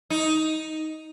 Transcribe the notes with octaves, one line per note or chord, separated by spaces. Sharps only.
D#4